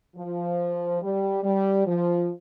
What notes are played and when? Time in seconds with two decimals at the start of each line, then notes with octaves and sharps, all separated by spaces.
0.16 F3
1.01 G3
1.43 G3
1.86 F3